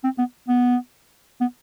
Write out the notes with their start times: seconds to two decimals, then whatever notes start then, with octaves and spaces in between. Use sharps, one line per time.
0.04 C4
0.18 B3
0.49 B3
1.41 B3